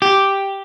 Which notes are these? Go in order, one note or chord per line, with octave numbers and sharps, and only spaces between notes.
G4